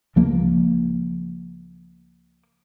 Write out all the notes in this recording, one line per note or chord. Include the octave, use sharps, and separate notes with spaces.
C#2 F3 A#3